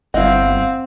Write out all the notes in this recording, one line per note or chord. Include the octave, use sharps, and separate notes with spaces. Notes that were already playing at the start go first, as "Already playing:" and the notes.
G1 C4 E4 D#5 F5 F#5